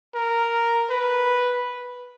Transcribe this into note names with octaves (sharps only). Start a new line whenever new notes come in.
A#4
B4